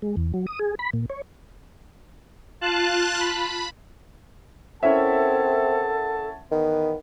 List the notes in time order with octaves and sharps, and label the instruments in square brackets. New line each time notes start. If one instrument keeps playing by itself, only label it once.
[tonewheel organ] G#3
E2
F#3
D#6
G#4
B5
A#2
C#5
[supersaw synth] F4 A5 F#6
B5
[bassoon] C4 [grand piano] C#4 E4 E5 [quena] A4 [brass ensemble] A#4 F#5 A5
[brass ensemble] E2 B3 [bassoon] D#3